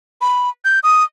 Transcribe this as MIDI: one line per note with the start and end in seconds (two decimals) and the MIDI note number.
0.21 0.49 83
0.65 0.80 91
0.83 1.04 87